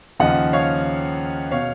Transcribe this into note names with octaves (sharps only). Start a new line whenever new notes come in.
D#2 C#3 F3 D#5 F#5
C#5 F5
B2 C#5 F5